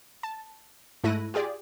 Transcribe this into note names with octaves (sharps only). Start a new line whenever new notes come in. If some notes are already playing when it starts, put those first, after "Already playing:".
A5
G#2 A3 E4 F#6 A#6 D#7
F4 G4 G#4 D5